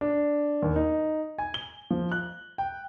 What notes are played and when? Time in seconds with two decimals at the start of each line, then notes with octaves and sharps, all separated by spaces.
0.01 D4
0.63 D#2
0.76 D#4
1.38 G#5
1.54 G7
1.91 F3
2.12 F#6
2.58 G5